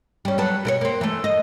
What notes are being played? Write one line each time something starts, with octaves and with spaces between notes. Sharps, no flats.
G3 C#4
F#3 B3 A4
B2 A#4 C#5
A#3 C4
E3 A3
D#5